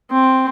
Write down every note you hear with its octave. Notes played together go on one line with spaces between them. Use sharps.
C4